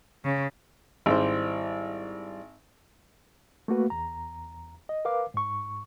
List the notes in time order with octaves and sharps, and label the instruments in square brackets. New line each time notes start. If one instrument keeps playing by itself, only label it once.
[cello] C#3
[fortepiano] G#1 [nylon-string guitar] G3 E4 C5
[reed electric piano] A3 A#3 F#4 B4
E2 A#5
D#5
A#4 B4 F5 D6
G#2 C#6